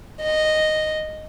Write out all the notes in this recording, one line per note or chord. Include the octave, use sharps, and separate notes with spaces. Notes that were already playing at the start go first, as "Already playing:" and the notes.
D#5